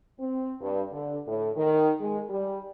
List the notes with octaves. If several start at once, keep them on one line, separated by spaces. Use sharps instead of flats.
C4
G2
D3
A2
D#3
G#3
G3